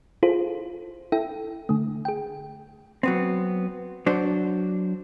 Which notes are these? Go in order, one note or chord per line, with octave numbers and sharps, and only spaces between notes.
E4 F4 G#4 A4 C5
E4 A4 E5 G5
D3 A3
G#4 G5
F#3 B3 C4
F#3 D4 C5